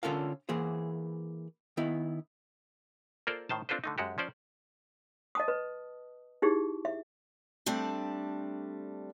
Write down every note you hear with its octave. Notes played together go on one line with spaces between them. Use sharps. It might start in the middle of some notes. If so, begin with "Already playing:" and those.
D3 C#4 F4 A4 A#4 F5
E3 A#3 G#4 C5
D#3 B3 E4
A#3 F4 A4 A#4 C5 D5
A2 D#3 C5 A5
C4 D4 F4 A4 B4 C5
D3 A3 D#4
F#2 G#3 F#4 G4
F3 C#4 C5 D5
D#5 A5 D#6
B4
D#4 E4 G4 G#4
E5
G3 A3 C4 D4